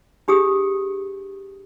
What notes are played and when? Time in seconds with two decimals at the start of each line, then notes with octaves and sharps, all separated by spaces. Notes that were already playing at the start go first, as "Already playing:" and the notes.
0.28 D4 G4 G#4 D#6